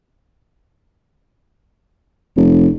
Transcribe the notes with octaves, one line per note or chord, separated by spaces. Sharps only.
F1